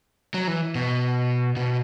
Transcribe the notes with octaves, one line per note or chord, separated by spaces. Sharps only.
F#3
E3
B2
B2